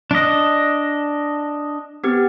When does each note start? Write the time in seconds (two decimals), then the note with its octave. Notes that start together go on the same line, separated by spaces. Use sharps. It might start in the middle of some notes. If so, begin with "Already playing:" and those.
0.11 D4 D#5
2.04 B3 C4 G4